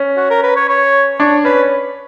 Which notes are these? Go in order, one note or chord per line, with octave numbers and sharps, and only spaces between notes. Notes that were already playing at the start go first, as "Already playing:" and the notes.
Already playing: C#4
F#4
A#4
B4
C#5
C#5
D4 C#5
C#4 B4